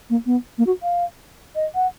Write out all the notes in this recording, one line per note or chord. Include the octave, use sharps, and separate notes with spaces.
A#3
B3
A#3
F#4
F5
D#5
F#5